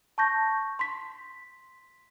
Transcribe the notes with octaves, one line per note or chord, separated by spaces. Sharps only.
A5 C#6 G6 A#6
C6 B6